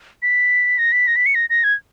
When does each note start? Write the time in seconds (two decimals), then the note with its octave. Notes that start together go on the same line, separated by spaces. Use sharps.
0.22 B6
0.78 A#6
0.92 B6
1.07 A#6
1.16 B6
1.26 C#7
1.35 A#6
1.50 A#6
1.64 G#6